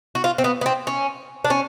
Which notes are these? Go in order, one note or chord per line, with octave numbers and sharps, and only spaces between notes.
F#4
F4
C4
B3
B3
C4
C#4
D4
C#4